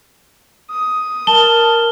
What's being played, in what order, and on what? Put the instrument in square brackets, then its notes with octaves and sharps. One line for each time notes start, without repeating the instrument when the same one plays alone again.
[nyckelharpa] D#6
[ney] A#4 [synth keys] A5 [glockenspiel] G7